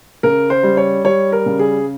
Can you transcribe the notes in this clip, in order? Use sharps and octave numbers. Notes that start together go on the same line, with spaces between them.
C#3 A#4
C5
G3
C#5
G3 C#5
A#4
C#3
G#4